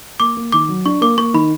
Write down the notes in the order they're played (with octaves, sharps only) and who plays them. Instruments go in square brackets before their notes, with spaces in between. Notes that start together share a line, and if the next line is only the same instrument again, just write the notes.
[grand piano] A#3 [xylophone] D6
[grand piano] A#3
[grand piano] D#3 [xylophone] D6
[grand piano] F#3
[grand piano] D4 [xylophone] C#6
[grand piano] A#3 [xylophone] D6
[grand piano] A#3 [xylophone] C#6
[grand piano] D#3 [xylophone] B5